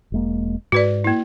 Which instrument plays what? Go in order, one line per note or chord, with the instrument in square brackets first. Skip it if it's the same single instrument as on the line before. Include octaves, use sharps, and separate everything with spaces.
[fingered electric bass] E1 G#3 A#3
[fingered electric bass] G#2 [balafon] F#4 B4 D5
[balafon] A#3 E4